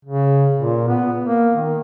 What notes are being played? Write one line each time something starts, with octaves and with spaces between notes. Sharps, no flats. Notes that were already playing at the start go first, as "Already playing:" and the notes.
C#3
A#2
B3
A#3
D#3